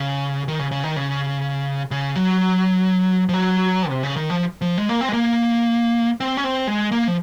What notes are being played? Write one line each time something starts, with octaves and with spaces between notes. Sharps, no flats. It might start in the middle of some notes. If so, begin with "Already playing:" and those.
Already playing: C#3
D#3
C#3
C#3
D#3
C#3
C#3
F#3
F3
F#3
C3
C#3
D#3
F3
F3
G#3
A#3
C4
G#3
A#3
C4
C#4
C4
G#3
A#3
F3